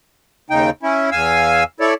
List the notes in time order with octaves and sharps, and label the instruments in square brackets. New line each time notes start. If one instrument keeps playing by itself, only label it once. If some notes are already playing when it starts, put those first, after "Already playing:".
[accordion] D#2 C#3 D#4 G5
C#4 E4
E2 F5 G#5 E6
E4 A4 C#5 D5